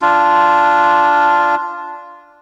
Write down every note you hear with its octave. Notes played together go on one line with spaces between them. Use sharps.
D4 F4